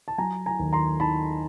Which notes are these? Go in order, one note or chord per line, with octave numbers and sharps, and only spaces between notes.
A5
F#3 G#5 A#5
G#5 A#5
D#2
A#5 C6
D#3 A5 B5